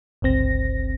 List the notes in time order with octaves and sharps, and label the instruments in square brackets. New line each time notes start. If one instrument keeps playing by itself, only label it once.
[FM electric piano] G1 C#2 C4 A#6